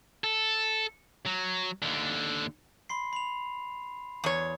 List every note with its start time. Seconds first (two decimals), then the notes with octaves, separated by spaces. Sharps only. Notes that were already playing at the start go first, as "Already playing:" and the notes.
0.24 A4
1.26 F#3
1.82 D#2 D3
2.89 B5 C6 C7
3.13 B5 F7
4.24 E2 C#5